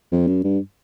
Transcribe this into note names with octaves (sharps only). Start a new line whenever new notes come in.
F2
F#2
G2